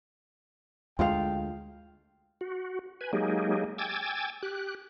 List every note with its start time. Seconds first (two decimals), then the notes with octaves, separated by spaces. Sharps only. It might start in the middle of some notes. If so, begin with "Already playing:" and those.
0.99 D2 G#3 F4 F5 G5
2.41 F#4
3.01 B4 G#5
3.13 F#3 G#3 A#3 D#4 G4 G#4
3.78 G5 G#5 D6 E6 G#6 A6
4.43 G4 F#6